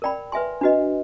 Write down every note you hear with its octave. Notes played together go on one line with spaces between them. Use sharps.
A#4 D5 G5 B5
B4 E5 G#5 C6
D4 F#4 B4 D#5